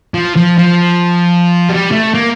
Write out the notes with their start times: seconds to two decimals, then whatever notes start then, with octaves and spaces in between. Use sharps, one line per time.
0.14 F3
0.36 F3
0.58 F3
1.69 G3
1.92 A3
2.14 A#3